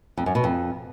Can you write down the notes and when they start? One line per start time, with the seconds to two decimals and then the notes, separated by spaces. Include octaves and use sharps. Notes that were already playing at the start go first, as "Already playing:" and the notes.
0.17 F2
0.26 F#2
0.35 B2
0.44 F2